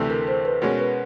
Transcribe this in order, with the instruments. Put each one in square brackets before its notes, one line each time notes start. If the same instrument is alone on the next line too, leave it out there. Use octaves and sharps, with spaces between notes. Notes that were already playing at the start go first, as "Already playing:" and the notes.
Already playing: [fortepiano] D2 C3 E3 A3
[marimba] A#4
C5
B4
[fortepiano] B2 G#3 C#4 [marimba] A#4
[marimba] B4